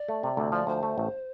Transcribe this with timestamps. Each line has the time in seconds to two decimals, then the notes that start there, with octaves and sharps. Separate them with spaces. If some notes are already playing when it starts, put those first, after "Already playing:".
Already playing: D5
0.08 A3
0.23 C3
0.37 D2
0.52 F3 D5
0.67 D2 C5
0.83 A3
0.98 A1